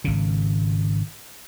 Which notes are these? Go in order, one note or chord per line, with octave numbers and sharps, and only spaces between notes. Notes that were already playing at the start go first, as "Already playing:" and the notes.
G#1 C#3